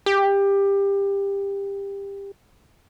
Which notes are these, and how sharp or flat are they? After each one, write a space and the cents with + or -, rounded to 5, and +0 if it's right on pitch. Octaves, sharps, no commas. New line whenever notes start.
G4 +20